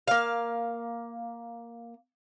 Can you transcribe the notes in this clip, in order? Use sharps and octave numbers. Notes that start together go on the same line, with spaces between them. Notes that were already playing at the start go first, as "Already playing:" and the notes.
A#3 F5